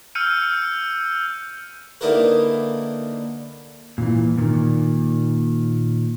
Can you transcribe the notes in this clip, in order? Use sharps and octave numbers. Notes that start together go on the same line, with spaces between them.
E6 F6 G6 C#7 D#7
D3 A#3 D#4 E4 A#4 B4
A#2 D#3 E3
A#2 D#3